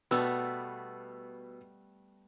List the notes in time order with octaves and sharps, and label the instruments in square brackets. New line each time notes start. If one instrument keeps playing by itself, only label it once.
[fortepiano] B2 E6 [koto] G3 A3 B3